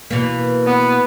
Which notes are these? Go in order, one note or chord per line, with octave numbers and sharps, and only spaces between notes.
B2 E3 A#3
B3